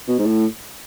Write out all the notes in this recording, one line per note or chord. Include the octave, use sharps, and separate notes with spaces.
B2
G#2
A2